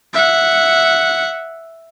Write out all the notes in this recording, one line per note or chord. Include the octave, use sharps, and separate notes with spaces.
E5 F#5